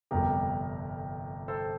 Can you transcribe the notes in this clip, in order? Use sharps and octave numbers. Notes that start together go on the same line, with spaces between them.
G1 F2 C3 G3 G4 A#4
A4 C5